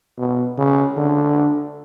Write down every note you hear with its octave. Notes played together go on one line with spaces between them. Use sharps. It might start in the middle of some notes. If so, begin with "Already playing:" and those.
B2
C#3
D3